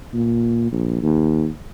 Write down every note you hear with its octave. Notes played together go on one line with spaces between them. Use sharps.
A#2
A#1
D#2